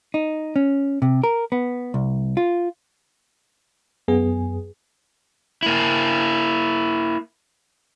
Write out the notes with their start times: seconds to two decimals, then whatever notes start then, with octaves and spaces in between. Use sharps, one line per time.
0.14 D#4
0.56 C#4
1.02 C3
1.24 A#4
1.52 B3
1.94 C2
2.37 F4
4.08 F#2 B3 G#4
5.63 A#3 E4